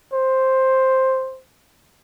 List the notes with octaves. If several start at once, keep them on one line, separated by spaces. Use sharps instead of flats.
C5